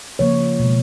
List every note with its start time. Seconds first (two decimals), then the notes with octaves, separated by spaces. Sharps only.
0.19 C#3 F3 A#3 C#5
0.60 B2 G#3